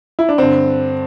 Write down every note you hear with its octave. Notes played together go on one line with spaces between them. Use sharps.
E4
D4
G2 D3 C4